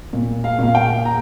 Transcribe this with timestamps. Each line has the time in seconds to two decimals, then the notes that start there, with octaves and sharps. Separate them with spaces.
0.13 A#2
0.44 F5
0.59 A#2 F5
0.75 G5
1.05 A#5